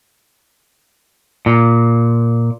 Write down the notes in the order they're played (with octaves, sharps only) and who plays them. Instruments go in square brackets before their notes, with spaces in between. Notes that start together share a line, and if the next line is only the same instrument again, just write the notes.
[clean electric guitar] A#2